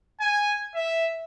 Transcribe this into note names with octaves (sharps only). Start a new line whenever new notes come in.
G#5
E5